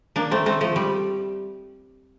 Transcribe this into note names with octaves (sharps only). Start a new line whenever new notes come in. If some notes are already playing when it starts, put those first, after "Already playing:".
A#3 D4
A3 C4
A3 C4
F3 A3
G3